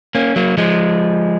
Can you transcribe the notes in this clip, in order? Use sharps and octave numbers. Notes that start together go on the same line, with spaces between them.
A#3 C#4
F#3 A#3
F3 G#3